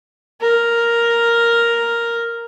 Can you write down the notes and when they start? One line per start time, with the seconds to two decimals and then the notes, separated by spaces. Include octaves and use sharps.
0.41 A#4